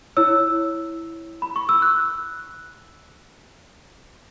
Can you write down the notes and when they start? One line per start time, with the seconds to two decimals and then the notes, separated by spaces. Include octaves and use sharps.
0.17 E4 C#5 E6
1.42 B5
1.56 C#6
1.69 E6
1.82 F#6